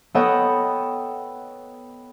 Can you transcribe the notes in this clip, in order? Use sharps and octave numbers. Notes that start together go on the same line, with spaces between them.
B3 A4 C#5 D#5 F#5 G5